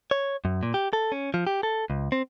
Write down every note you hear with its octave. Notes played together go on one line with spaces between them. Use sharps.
C#5
F#2
A#2
G4
A4
C#4
F3
G4
A4
C#2
C4